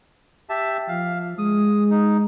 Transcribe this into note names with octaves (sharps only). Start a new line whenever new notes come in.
G4 E5 A5
F3 F5
G#3 D#6
D#4